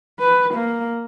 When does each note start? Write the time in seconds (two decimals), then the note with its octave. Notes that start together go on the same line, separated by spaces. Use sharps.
0.20 B4
0.54 A#3